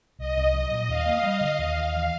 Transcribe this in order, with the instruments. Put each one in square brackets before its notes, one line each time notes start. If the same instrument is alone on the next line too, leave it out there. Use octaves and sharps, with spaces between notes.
[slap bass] C2 [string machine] D#5
[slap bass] C2
F#3
A#2
[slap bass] D#2 [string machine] F5
[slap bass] A#3
G3
D3
[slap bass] D#2 [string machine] F5
[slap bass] D#2
E3